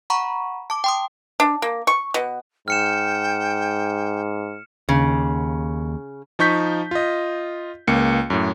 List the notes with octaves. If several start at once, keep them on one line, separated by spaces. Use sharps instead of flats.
F#5 A#5 B5 C#6
A5 D6
G5 C6 D#6
D4
A#3
C#6
B2
G#2 G5 F6 C#7 E7
D#2 C#3
F3 D#4 C#6 G6 B6
F4 D#5
C#2 A#3 C#7
F#2 A2